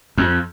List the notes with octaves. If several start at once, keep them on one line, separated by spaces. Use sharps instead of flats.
F2